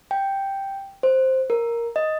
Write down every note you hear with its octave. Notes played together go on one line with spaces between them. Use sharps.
G5
C5
A#4
D#5